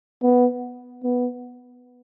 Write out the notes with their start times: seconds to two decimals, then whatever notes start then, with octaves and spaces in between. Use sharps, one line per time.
0.23 B3
1.04 B3